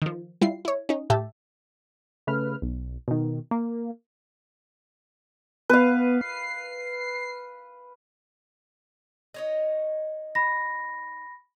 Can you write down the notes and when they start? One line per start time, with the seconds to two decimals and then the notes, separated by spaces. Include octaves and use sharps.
0.02 D#3 F3
0.41 G3 E4 F4 C7
0.65 E4 C#5
0.89 C#4 D#4
1.10 A2 G4 E5 A5
2.27 C#3 A3 B4 F6
2.62 B1
3.08 B2 D#3
3.51 A#3
5.69 B3 B4 F5
6.21 C7
9.34 D#4 C#5 D#5
10.35 B5 A#6